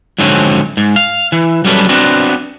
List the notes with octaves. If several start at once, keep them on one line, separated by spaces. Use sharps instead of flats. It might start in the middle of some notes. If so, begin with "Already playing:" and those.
F2 G#2 D3 F#3 C4 C#4
G#2
F5
E3
F#3 G3 C#4 A4 B4
B3 C4 D4 F#4